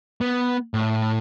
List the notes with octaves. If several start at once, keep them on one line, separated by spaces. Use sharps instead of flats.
B3
A2